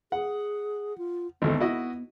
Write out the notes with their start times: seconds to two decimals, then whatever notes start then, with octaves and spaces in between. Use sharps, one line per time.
0.12 G#4 F#5
0.98 F4
1.42 G#1 D2 B3 A4
1.60 E4 F#4 D#5